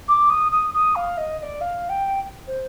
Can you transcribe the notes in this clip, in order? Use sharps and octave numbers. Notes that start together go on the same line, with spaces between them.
D6
D#6
D#6
D#6
F5
D#5
D#5
D5
F5
G5
C5